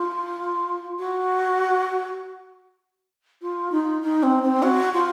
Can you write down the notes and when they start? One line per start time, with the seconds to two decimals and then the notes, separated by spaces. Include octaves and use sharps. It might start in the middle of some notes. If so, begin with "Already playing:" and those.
Already playing: F4
0.99 F#4
3.42 F4
3.72 D#4
4.02 D#4
4.23 C4
4.43 C4
4.62 F#4
4.94 F4